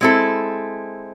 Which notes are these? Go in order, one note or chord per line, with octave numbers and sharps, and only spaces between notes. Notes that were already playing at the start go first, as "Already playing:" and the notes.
G#3 C4 E4 A4